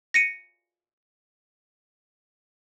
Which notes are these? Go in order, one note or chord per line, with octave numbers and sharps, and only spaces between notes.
A#6 C#7 D#7